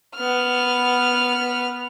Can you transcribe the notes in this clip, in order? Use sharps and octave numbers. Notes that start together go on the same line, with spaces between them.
B3 F6